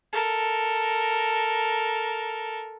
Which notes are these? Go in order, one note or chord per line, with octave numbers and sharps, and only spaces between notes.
A4 A#4